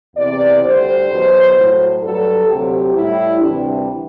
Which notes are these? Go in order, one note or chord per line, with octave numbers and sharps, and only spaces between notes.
E2 C3 E3 D5
D2 D3 G3 C5
E2 B2 F#3
A2 F#3
G2 F#3 A4
D2 C3 F#3 G4
A2 G3 E4
D2 C3 E3 G3 D4